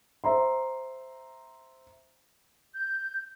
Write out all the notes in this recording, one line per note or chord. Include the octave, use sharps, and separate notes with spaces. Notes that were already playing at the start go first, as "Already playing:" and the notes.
C5 E5 A#5 C6
G6